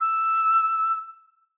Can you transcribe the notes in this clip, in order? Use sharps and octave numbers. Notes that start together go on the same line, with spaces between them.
E6